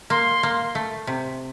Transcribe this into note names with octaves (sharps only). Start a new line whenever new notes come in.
A#3 C6
A#3
A3
C3